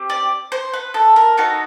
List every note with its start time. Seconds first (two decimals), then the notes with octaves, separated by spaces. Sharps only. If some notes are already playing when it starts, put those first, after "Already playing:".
Already playing: C4 G4
0.10 D5
0.52 C5
0.74 B4
0.94 A4
1.16 A#4
1.38 B3 D#4 F#4 A4